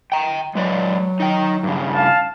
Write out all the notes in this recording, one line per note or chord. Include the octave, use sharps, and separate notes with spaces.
G5 A#5
F#3 G#3 B4 D5
D#4 D#5 G5
G2 C#3
F5 A5